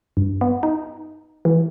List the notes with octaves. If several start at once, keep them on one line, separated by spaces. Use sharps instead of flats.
G2
B3
D#4
E3